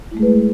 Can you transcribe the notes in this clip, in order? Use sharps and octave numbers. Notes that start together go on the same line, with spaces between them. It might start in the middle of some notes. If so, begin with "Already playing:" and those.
G#3 A3 E4 G#4 B4